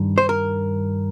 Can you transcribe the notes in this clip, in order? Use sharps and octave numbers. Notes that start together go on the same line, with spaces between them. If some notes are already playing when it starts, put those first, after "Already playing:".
Already playing: G2 D#3 G3
C5
A#4